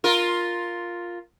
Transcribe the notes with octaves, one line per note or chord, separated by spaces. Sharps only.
F4 A#4